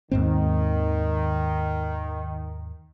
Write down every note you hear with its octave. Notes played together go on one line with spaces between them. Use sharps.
D#2 G#2 D#3 C4